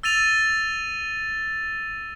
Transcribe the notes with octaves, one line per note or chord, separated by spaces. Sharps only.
E6 A6 D#7 F7